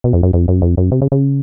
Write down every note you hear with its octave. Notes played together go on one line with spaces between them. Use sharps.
B2
F2
F#2
F2
F#2
F2
F#2
C3
C#3
C#3